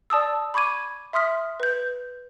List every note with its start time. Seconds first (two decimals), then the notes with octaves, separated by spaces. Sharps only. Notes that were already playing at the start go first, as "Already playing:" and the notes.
0.10 D5 A5 D#6 E6
0.54 B5 C#6 D6 G#6 D#7
1.13 E5 C6 D#6 F6 B6
1.60 B4 G6